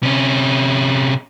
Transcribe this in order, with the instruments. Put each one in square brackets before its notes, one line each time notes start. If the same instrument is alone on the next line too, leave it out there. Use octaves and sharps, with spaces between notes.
[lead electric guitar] C3 C#4